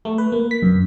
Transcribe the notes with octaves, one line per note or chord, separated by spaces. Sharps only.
A3
B4
A#3
B6
F#2